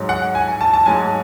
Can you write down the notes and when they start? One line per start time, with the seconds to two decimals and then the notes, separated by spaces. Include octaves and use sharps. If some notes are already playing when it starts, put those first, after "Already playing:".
Already playing: G#2 F#3
0.09 F#5
0.35 G#5
0.48 G#5
0.61 A5
0.74 A5
0.86 G#2 F#3 G#5